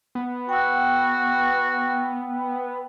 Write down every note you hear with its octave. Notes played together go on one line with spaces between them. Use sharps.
B3
F#4 G5 E6